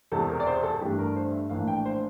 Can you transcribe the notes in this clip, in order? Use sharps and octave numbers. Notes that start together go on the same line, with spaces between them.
E1 E2 C3 A4
A#4
D5
C5
A4
G2 E3 A3 D4 G4
A#4
C5
E5
A#1 A2 E3 A#3 D4 F5
G5
C5